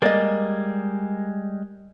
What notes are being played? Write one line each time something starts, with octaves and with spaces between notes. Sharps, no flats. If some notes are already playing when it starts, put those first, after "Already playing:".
G3 G#3 A#3 D5 D#5